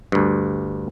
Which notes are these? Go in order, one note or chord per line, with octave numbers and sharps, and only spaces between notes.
D2 G2